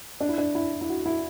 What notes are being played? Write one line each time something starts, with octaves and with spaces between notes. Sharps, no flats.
D4
E4
D4
E4
E4
F#4
E4